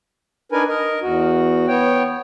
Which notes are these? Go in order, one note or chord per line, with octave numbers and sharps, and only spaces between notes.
D4 D#4 A#4 B4 G#5
A#4 D#5
E2 F#4
B3 C#5 G5